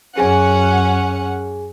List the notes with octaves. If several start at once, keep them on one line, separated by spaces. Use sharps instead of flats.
F#2 C#4 G#4 F#5 G#5